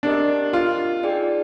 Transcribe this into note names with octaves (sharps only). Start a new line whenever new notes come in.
C4 D4 G4 A#4 D#5
F4
D#4 G#4 D5 G5